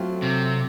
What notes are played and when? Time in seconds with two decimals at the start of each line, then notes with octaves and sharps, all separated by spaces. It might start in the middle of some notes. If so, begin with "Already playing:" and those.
Already playing: F#3 A3 C4 F4
0.22 C3